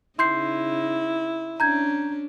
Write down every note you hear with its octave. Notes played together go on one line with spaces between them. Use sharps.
C#3 D#4 E4 C6 G6 C7
C#4 D4 A#5 G6 G#6